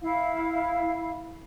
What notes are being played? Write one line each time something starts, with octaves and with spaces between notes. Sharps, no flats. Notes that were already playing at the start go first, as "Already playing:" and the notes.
E4 F5